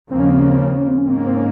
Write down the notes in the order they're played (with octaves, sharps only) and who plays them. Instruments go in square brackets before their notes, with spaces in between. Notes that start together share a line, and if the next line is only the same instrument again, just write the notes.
[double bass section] D#2 C#3 F3 A#3 [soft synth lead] C4
[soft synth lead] C#4
C4
C#4
C4
C#4
C4
C#4
C4
C#4
[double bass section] G#2 D#3 A#3 [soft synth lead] C4
[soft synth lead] C#4
C4
C#4